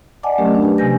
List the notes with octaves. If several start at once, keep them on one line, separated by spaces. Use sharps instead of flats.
D5 D#5 F#5 G#5 A5 D6
F#3 A3 C#4 G4 A#4
D4 G4
G4 B4
C3 F3 G#5 G6 A#6